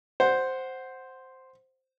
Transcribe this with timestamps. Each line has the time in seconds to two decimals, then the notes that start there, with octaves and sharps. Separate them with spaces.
0.20 C5 F#5